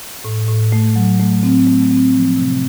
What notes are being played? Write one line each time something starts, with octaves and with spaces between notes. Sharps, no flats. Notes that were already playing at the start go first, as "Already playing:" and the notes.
A2
A2
A3
F#3
A3
C4
A3
C4
F3
C3